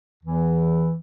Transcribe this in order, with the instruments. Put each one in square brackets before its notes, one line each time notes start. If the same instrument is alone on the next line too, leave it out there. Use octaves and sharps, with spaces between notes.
[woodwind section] E2 E3